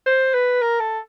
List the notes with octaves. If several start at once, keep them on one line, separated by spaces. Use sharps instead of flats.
C5
B4
A#4
A4